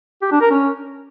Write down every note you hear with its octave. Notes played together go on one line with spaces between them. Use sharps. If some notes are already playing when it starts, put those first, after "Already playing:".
G4
D4
A#4
C#4